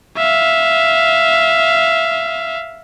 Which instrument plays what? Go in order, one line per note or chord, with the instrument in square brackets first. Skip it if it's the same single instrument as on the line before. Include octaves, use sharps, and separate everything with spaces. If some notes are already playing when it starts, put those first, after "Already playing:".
[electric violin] E5 F5